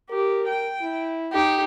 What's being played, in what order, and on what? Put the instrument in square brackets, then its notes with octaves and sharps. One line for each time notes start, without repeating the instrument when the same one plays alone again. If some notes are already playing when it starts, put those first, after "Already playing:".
[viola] G4 [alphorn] A#4
[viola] G5
[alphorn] E4
[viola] D#4 [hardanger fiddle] G4